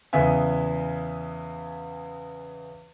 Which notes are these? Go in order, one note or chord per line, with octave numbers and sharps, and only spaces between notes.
E2 C#3 B3 E5 G#5